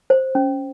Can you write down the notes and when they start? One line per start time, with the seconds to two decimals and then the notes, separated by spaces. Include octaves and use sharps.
0.10 C5
0.35 C#4